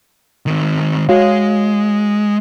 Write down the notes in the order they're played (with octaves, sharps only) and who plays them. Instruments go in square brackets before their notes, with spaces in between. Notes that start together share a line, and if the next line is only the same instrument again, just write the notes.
[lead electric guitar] D#3 C4
[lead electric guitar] G#3 [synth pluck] F#4 C#5 F5